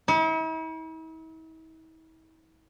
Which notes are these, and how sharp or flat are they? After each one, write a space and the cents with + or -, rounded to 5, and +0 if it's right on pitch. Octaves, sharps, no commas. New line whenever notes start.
E4 -45